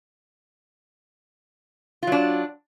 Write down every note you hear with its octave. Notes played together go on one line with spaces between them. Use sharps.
F#3 D4 F4